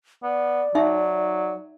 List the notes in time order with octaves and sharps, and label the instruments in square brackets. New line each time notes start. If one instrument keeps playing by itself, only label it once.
[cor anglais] B3 [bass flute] D5
[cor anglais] F#3 [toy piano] D#4 E5